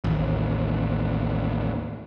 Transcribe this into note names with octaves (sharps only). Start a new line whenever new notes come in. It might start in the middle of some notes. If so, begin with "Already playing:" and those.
A1 D#2